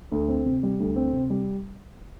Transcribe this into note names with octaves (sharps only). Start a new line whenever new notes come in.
D2
C4
C3
G3
D2
C4
C3
G3